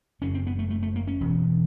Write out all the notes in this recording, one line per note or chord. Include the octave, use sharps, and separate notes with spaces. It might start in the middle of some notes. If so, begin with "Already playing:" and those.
F#1 F#2 C#3 C#4
C4
B3
A3
A3
A3
A#3
C#4
E1 E2 B2